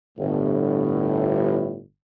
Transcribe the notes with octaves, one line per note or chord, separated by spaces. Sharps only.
G1 A2